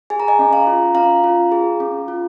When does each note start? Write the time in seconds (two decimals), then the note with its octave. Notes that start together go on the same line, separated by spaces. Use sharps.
0.10 G#4 G#5
0.20 A#5
0.28 D#5 G#5
0.39 C#4
0.53 F5 A#5
0.67 F4
0.95 C#4 F5 A#5
1.24 F4
1.52 G#4
1.80 C#4
2.08 F4